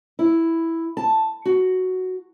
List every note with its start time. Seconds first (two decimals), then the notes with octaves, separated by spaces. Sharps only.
0.19 E4
0.97 A5
1.45 F#4